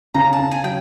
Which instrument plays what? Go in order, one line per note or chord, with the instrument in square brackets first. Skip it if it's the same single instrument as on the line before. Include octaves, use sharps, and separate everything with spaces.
[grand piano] C#3 [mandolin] A#5
[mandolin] A5
[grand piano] C#3
[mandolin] G#5
[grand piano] F#3 [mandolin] G5